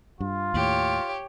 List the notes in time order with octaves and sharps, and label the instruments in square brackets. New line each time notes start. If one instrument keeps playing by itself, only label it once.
[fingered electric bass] G2 [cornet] F4
[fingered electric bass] D#2 A2 [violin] G4 C#5